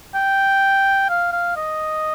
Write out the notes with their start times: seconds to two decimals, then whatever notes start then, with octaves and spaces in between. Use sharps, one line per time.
0.15 G5
1.09 F5
1.32 F5
1.56 D#5